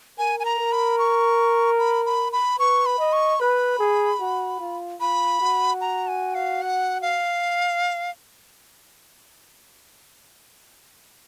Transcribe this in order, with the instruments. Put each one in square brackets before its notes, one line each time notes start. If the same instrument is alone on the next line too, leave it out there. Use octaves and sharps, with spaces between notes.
[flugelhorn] A#4 [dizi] G#5
[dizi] G#5
A#5
[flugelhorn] A#4
[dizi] B5
C#6
B5
B5
B5
[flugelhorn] B4 [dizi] C#6
[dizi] B5
[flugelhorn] D#5
[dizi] C#6
[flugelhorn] B4 [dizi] B5
[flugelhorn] G#4
F#4
F4
[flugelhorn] F4 [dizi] B5
[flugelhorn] F#4
[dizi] A#5
G#5
F5
F#5
F5